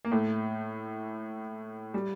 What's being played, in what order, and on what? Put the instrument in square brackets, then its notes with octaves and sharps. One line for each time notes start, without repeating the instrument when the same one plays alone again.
[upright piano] A#3
A2 A3
G3